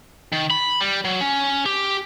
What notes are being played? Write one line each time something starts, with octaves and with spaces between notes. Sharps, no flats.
D#3
B5
G3
F#3
C#4
G4